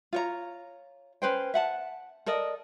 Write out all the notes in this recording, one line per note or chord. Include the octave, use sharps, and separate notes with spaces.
F4 C#5 A#5
C#4 B4 C5 G5
E5 F#5 A5
A4 A#4 D5 D#5